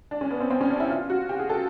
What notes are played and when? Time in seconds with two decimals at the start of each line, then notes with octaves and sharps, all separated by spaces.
0.11 D4
0.21 C#4
0.30 B3
0.40 C4
0.50 C4
0.61 C#4
0.70 D4
0.80 E4
0.90 F4
1.10 F#4
1.29 G4
1.39 G#4
1.50 A4